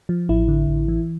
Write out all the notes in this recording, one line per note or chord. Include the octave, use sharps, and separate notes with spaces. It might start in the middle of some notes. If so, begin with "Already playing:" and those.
F3
A1 E4
D3
A1
E3